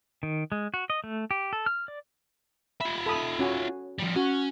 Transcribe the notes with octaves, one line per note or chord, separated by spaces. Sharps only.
D#3
G#3
F#4
D#5
A3
G4
A4
F6
D5
F4 E5 B5
A4 B5 D#6
C#4 F#4 G#5
F3 G3
C#4 F#4